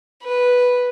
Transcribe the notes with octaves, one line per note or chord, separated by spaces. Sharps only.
B4